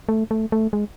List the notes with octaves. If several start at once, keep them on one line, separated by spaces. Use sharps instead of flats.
A3
A3
A3
G#3